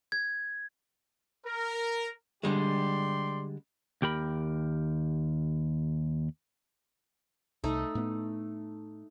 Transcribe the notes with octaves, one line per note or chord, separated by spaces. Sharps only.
G#6
A#4
D3 G3 G#3 G4 D5 C6
D#2 G4 A#4 B5
C2 A3 D#4
A2 B3